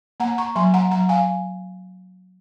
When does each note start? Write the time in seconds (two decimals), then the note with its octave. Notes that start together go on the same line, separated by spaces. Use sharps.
0.20 A#3 F#5 A#5
0.38 A#5 C#6
0.56 F#3 G#5 C6
0.74 F#5 A#5
0.91 F#3 F#5 A#5
1.09 F5 G#5